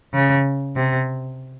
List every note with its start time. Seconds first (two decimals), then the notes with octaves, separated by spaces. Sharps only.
0.14 C#3
0.76 C3